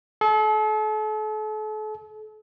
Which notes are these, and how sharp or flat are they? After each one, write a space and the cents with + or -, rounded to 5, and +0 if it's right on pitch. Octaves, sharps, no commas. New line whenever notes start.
A4 -40